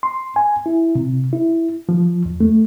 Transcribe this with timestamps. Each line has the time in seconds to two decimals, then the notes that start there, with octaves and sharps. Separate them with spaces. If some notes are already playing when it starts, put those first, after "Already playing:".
0.03 C6
0.36 G#5
0.66 E4
0.95 C3
1.33 E4
1.89 F3
2.26 E2
2.41 A3